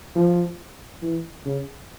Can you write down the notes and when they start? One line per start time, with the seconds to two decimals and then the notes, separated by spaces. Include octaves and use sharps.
0.16 F3
1.03 E3
1.46 C#3